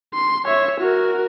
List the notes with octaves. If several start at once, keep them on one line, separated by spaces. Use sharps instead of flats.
C6
C#5 E5
F#4 A#4